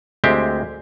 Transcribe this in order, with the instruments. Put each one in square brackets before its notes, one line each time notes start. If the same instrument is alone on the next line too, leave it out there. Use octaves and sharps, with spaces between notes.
[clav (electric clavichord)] D2 G#3 C4 G4 E5